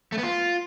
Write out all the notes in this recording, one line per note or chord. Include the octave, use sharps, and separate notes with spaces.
A3
B3
F4